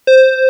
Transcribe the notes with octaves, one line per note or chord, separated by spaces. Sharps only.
C5